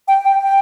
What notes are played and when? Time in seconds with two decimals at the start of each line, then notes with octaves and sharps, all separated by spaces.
0.08 G5
0.25 G5
0.42 G5